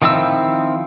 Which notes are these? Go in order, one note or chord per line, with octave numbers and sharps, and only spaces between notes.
D#3 F3 C4 E4 E6